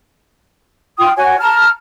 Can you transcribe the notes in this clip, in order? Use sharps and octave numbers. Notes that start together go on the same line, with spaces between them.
F4 G5 D#6
F#4 C#5 G#5
A5 A#5 F6